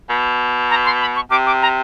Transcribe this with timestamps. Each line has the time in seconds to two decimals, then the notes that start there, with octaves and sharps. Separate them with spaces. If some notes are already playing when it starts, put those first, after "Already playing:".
0.10 B2
0.70 A#5
0.85 C6
1.01 B5
1.16 C#6
1.30 C3 D6
1.46 D6
1.62 A#5